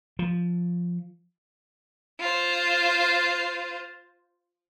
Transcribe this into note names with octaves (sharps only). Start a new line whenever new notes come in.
F3
F4 C5